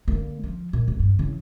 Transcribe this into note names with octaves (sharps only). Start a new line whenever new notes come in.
D3 A#3
F3
A#2
D1
G2
C#3 E3